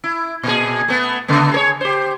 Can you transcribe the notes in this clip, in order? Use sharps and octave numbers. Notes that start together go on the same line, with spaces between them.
E4
A#2 G#4
A3 B3
C#3 A3 B3
G#4 A#4 C#5
G4 C5